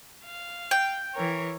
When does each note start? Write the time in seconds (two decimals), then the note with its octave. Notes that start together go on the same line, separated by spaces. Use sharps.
0.25 F5
0.71 G5
1.14 E3 A#4 C#5